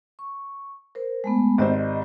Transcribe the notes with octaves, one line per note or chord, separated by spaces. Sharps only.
C#6
A#4 C5
G#3 A3 B3
G#1 G4 C5 D5 D#5